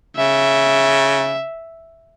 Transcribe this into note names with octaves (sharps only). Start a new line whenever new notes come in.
C#3 E5